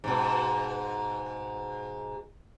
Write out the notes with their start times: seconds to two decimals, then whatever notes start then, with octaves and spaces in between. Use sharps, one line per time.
0.04 G#2 B2